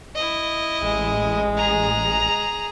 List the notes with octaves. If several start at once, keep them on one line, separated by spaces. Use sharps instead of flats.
E4 D#5
A1 G#3
G#4 A#5